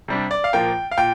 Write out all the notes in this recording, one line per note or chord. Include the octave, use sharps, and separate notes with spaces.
C3 G3 D4
D5
F5
A#2 F3 A#3 G5
F5
A#2 G5